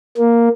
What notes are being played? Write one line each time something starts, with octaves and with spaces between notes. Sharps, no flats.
A#3